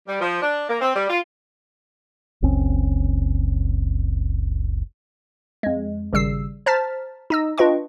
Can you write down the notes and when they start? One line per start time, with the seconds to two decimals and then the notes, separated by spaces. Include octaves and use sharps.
0.08 G3
0.20 F3
0.41 D4
0.69 A#3
0.81 C4
0.95 G3
1.09 F4
2.42 F#1 C#2 C4 C#4
5.63 F2 G#3
6.13 G#1 C#3 G3 E6 C7
6.66 C5 A5 A#5 F6 A6 B6
7.30 D#4 D#5 E6
7.58 D4 F4 B4 D#5 G5 C#6